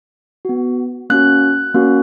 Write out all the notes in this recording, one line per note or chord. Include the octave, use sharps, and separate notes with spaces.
B3 F#4
A#3 C#4 F#4 F#6
A#3 C#4 F#4